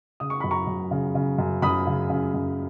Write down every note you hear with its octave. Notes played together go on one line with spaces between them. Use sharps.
C#3 D#6
C#6
F#2 B5
A#5 C#6
F#2
C#3
C#3
F#2
F#2 B5 D#6
C#3
C#3
F#2